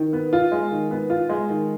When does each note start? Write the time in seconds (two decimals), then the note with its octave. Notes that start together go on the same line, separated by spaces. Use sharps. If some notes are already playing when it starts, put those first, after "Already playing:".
Already playing: D#3
0.13 B3
0.33 F4
0.52 G#3
0.71 D#3
0.91 B3
1.10 F4
1.29 G#3
1.49 D#3